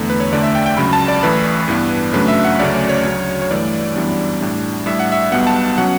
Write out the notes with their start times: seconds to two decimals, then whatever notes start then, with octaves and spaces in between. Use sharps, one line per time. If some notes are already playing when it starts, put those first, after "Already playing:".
Already playing: E2 D3 A3
0.10 B4
0.20 C#5
0.33 D2 D3 A3 D4 D5
0.43 E5
0.55 G5
0.66 G5
0.77 C#2 C#3 F#3 B5
0.93 A5
1.08 D5
1.23 A1 A2 E3 A3 B4
1.68 G2 E3 B3 D4
2.13 F#2 C#3 F#3 A3 D4 B4
2.28 E5
2.45 F#5
2.59 D2 C#3 F#3 A3 C#4 D5
2.74 C#5
2.89 C#5
3.05 D2 C#3 F#3
3.42 C#5
3.51 G2 E3 A3 D5
3.95 F#2 E3 G3 B3 D4
4.41 A2 G3 D4
4.86 A2 G3 D4 E5
5.00 F#5
5.12 E5
5.32 B1 B2 G3 B3 F#5
5.47 A5
5.78 B2 F#3 C#4 F#5